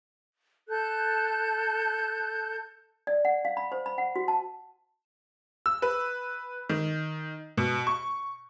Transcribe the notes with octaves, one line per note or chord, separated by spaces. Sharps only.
A4 F#6 G6
D5
F#5
F5
B5
C5
B5
F#5
F#4
A5
E6
B4
D#3
B2
C#6